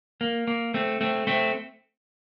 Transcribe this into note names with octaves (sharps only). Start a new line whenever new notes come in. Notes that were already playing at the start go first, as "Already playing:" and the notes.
A#3
A#3
A3 C4
A3 C4
A3 C4